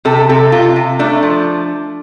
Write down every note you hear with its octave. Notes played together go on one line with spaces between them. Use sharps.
C3 A4
C3 A4
C3 F4
C3
A3 D4
F3